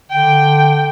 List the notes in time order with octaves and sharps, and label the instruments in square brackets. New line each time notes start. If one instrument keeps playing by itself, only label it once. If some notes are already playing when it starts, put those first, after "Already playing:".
[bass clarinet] D3 [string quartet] G5